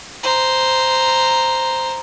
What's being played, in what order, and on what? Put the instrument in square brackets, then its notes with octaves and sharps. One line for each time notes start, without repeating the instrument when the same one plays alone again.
[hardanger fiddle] C5 A#5